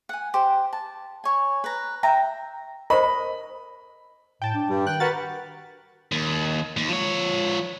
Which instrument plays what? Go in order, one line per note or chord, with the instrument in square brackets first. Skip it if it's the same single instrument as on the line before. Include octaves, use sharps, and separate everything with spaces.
[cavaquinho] F#5 G#5
G4 C5
A5
C#5 G#5
B4 A#5
E5 G5 A#5
[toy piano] A#4 C5 [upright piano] D#5 [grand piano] B5
[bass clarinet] A2 [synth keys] G5 A5
[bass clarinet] D4
[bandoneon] G2 G3
[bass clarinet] D#3 [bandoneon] G5 [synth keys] F#6
[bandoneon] F#4 A#4 [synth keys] B4 F#5 A6
[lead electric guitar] D#2
D#2
F3 C#5